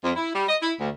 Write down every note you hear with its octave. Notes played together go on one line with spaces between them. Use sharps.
F2
E4
G3
D#5
E4
D2